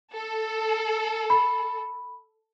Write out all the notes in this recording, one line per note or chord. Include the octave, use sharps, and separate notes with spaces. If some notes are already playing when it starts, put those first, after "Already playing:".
A4
B5